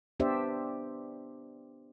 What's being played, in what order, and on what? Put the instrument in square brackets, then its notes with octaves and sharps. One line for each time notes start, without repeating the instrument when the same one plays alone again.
[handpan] B3 D4 G4 C5 D5 E5